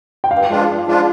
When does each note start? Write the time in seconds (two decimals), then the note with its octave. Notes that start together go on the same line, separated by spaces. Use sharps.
0.24 G5
0.31 G2 F5
0.49 F3 G#3 D4 F4
0.68 G2
0.86 F3 G#3 D4 F4